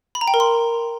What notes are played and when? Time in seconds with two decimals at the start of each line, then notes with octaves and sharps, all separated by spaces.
0.15 B5
0.21 A#5
0.28 G5
0.34 A#4
0.40 C6